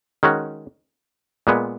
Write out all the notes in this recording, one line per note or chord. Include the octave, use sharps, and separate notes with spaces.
D#3 G#3 C#4 F#4
A#2 G#3 B3